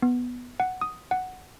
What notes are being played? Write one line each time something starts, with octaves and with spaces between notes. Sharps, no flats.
B3
F#5
D#6
F#5